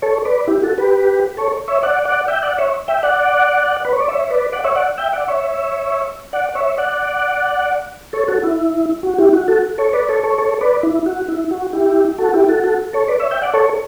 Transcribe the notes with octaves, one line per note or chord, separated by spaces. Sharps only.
A4 C#5
B4 D5
E4 G4
F#4 A4
G4 B4
A4 C#5
C#5 E5
D5 F#5
D5 F#5
E5 G5
D5 F#5
C#5 E5
E5 G5
D5 F#5
B4
C#5
D5
C#5 E5
B4 D5
D5 F#5
C#5 E5
D5 F#5
E5 G5
D5 F#5
C#5 E5
D5 F#5
C#5 E5
D5 F#5
A4 C#5
F#4 A4
E4
F#4
E4 G4
F#4
F#4 A4
A4 C#5
B4 D5
A4 C#5
A4 C#5
A4 C#5
B4 D5
E4
F#4
E4
F#4
E4 G4
F#4 A4
E4 G4
F#4 A4
F#4 A4
A4 C#5
B4 D5
C#5 E5
E5 G5
D5 F#5
A4 C#5